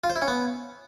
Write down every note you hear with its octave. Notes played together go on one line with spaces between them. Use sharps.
F4
C5
E4
C#4
B3